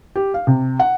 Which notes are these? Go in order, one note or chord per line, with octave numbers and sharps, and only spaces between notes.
G4
F5
C3
F#5